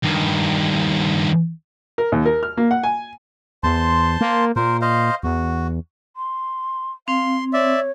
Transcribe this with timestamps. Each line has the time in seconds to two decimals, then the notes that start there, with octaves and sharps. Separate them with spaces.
0.03 G2 D#3
1.98 A#4
2.12 D#2
2.25 A#4
2.43 F6
2.57 A#3
2.71 F#5
2.83 G#5
3.63 E2 C5 A5 C6
4.21 A#3
4.56 A#2 A#4 C5
4.81 C5 D#5 F5
5.23 E2 F#4
6.17 C6
7.08 C4 F5 C6
7.53 C#5 D5 E5